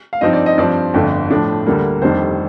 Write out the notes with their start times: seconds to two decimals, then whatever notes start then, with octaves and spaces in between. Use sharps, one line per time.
0.13 F5
0.21 G2 F3 C4 D#4 D#5
0.33 D5
0.46 D#5
0.58 G2 F3 C4 D5
0.94 G1 F2 D3 A3
1.30 A2 F3 A3 D4
1.66 D2 D3 G3 A#3
2.02 F1 F2 D#3 G3 D4 C5